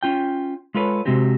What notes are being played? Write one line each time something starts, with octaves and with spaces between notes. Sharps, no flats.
C#4 F4 G5
G#3 F4 A4 B4 C#5
C3 G#3 C4 F#4 G4